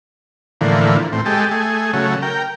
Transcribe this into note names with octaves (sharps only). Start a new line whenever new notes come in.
A2 D3 E3 F3 A#3
A2 C4
G#3 G4 A4
A3 G#4
C#3 F#3 A3
A#4 G5